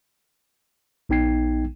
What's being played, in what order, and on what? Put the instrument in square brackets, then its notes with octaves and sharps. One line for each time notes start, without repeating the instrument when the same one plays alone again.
[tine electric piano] A#1 B3 D#4 G5 G#6 C7